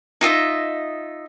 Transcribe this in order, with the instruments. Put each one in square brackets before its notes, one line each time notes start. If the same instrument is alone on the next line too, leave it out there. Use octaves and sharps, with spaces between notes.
[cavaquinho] D#4 F4 D#5 E5